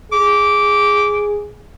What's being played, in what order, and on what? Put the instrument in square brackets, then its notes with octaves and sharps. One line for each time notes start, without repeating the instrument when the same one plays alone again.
[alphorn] G#4 [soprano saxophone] D6